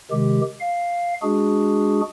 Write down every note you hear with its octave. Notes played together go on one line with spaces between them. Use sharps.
C3 D#3 G#3 G4
F5
G#3 D4 F#4 G#4